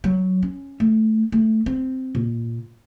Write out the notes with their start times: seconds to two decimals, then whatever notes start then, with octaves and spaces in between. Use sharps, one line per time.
0.04 F#3
0.43 C#4
0.80 A3
1.32 A3
1.66 C4
2.15 A#2